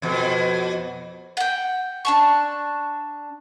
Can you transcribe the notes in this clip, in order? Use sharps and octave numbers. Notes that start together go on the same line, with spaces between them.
F2 B2
F#5 G5
D4 A5 C#6